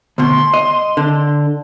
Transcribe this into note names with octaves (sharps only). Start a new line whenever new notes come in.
D2 B2 C6
D#5
D3